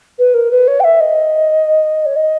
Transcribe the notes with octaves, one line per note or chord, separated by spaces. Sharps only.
B4
A#4
B4
C#5
G5
E5
D#5
C#5
D#5